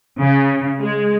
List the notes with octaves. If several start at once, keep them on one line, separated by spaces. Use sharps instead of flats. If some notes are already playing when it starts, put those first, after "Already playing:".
C#3
G#3